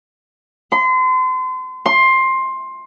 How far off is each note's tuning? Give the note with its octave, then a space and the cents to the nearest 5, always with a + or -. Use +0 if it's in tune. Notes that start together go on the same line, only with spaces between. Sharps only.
C6 -35
C6 +15